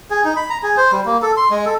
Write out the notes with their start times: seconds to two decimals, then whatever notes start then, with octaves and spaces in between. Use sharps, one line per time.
0.10 G#4
0.24 D#4
0.36 B5
0.50 A#5
0.63 G#4
0.77 C5
0.92 G3
1.06 A#3
1.22 A4
1.37 C6
1.51 G#3
1.66 A4